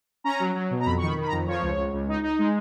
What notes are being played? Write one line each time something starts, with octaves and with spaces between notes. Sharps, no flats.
C#4 A#5
F#3
F#3
B2
A#5
F2 B5
C#6
D#3
B5
D#3
B5
A#5
F2
F3 C#5
C#2
C#2
C#2
D#4
D#4
G#3